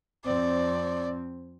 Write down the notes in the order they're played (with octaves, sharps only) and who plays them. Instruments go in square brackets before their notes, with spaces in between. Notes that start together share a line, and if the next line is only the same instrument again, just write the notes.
[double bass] F2 C4 [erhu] D5